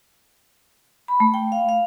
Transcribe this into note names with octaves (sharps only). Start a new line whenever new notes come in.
B5
A3
G5
F5
F5